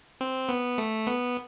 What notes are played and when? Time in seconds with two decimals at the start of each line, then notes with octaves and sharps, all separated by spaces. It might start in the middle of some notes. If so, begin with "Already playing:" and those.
0.21 C4
0.49 B3
0.78 A3
1.07 B3